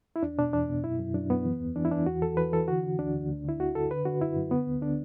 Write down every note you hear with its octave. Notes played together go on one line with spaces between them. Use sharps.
E4
E2 D4
B2 D4
E2 D4
B2
F#2 E4
F#2
F#2 D4
F#2 B3
E3
E2
E3 D4
E4
E3 D4
E2 F#4
E2 A4
E3 B4
E3 A4
D3 F#4
D3
D2 D4
D2
D2
D3 E4
D2 F#4
D3 A4
D3 B4
D3 F#4
F#2 E4
F#2
D3 B3
D2
D3 D4